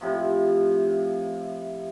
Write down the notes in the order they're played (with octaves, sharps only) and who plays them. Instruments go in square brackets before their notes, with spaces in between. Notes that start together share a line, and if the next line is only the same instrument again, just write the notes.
[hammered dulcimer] A2 C3 F3